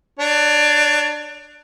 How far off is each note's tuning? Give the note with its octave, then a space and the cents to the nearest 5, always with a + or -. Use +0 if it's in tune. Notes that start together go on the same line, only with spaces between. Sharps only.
D4 +20 C#5 +45